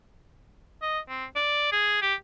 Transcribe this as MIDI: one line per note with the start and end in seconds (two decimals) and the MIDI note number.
0.82 0.99 75
1.09 1.25 60
1.36 1.68 74
1.72 2.00 68
2.02 2.15 67